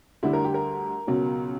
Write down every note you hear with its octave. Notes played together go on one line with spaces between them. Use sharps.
D2 D3 G3 E4
A#4
G4
A#4
C#2 B2 F#3